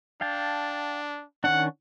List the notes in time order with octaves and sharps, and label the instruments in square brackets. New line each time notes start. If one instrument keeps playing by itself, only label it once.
[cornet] D4 [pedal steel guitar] F5 G5 A5
[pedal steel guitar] D#3 C#4 D4 [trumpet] F#5